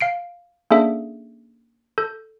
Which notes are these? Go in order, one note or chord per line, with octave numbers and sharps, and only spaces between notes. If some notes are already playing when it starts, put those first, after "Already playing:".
F5 C7 D7
A#3 C#4 D4 G#4 A4 E5
A4 G6